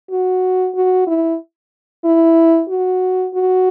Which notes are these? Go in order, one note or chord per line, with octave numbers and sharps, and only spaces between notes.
F#4
F#4
E4
E4
F#4
F#4